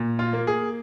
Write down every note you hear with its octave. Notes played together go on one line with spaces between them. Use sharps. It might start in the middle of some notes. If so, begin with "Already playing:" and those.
Already playing: A#2
F4
A#3
G#4